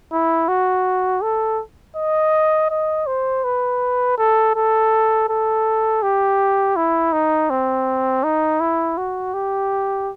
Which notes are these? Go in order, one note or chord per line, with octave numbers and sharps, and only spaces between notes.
E4
F#4
A4
D#5
D#5
C5
B4
A4
A4
A4
G4
E4
D#4
C4
D#4
E4
F#4
G4